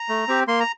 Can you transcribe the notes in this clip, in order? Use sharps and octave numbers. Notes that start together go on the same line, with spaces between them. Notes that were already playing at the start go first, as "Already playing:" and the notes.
Already playing: A#5
A3
C4 G4
A#3 C6
A#5